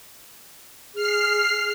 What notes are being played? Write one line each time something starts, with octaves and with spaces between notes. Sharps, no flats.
G#4 F6 C7